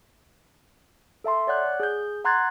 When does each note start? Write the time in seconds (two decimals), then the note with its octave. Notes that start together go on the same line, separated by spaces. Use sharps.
1.24 A4 E5 A5 C6
1.47 C#5 D5 F#5 F#6 G6
1.80 G#4 G6
2.25 F#5 A#5 C6 F#6 G#6 A6